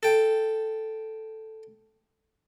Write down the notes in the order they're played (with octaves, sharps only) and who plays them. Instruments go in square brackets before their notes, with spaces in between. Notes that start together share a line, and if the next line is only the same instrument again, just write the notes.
[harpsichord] A4 G5